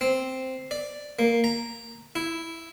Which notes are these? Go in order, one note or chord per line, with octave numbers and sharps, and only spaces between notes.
C4
D5
A#3
A#5
E4